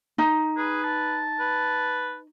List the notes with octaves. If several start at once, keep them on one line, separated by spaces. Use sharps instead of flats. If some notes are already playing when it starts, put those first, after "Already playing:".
D#4
G#4 B4
A5
B4